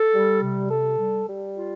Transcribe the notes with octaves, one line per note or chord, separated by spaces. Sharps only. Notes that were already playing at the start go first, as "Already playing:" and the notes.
Already playing: A4
G3
C3
A4
G3
G3
F4